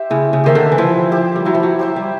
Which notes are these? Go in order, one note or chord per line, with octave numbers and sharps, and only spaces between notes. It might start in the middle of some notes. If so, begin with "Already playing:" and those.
Already playing: G4 C5 E5
C#3 E4
C#3
D#3 G4 C5 E5
D3
E3
F3 E4
G4 C5 E5
G3
F#3 E4
F3
F#3
G4 C5 E5
G3